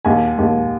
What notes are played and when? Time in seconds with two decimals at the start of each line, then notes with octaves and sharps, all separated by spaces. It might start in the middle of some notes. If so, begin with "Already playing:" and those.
0.05 D#2 G#5
0.38 D#2